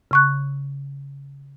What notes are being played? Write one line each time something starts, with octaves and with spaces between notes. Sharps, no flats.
C#3 C#6 F#6